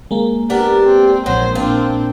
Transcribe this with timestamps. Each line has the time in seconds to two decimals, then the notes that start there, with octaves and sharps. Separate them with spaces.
0.11 G#3 A#3
0.50 B3 D4 G4 A#4
0.86 C4
1.26 A#1 F#3 C5
1.55 A#2 C4 D4 F4